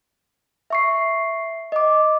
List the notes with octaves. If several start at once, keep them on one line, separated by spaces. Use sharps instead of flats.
E5 C#6 C7
D#5 D6